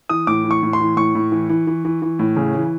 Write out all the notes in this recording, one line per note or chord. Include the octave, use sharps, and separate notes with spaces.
E3 D#6
A2 D6
E3
C#6
A2
C6
E3
A2 C#6
A2
E3
E3
E3
E3
E3
A2
C#3
E3